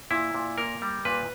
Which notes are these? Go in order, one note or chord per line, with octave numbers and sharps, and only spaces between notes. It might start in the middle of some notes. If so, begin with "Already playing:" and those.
A#2 E4
A#2
A#3 A#4
G3
A#2 B4